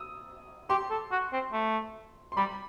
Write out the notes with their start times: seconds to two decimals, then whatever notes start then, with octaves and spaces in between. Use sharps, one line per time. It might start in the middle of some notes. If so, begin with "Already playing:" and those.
Already playing: D#6 E6
0.70 G4 C6
0.90 A4
1.11 F#4
1.32 C4
1.53 A3
2.32 C6
2.37 G3 B5